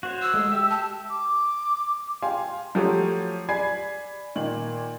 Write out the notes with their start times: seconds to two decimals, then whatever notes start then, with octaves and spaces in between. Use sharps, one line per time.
0.03 F#4 C5 C#5
0.22 E6
0.34 G#3 A3
0.52 G4 E5
0.70 A5
1.10 D6
2.22 F5 G5 G#5 C6
2.75 F3 F#3 A3 G4 C#5
3.49 D5 G#5 B5 G#6 C7
4.36 A#2 D#3 F#7